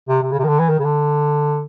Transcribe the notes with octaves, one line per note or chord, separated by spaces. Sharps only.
C3
C3
C#3
C3
D#3
D3
E3
D#3
C#3
D3